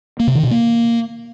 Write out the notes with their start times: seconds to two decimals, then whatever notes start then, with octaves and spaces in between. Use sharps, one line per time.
0.20 A#3
0.27 C3
0.35 D#3
0.43 B2
0.51 A#3